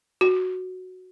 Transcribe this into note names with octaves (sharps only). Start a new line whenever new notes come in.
F#4